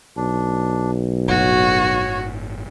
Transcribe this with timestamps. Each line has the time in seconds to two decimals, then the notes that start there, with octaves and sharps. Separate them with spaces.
0.17 B1 D4
1.28 G1 A2 F#4 C#5